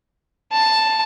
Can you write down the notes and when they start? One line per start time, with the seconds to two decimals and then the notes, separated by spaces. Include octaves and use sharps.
0.52 A5